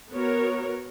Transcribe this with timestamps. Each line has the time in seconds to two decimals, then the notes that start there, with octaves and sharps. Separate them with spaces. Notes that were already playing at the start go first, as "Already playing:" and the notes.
0.13 B3 F#4 A#4 C#5